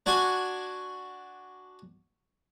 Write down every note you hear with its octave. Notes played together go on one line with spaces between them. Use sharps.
D4 F#4 G#5